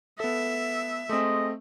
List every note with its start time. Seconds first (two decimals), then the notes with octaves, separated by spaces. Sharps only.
0.20 B3 A4 E5
1.09 G#3 A3 C4 D#5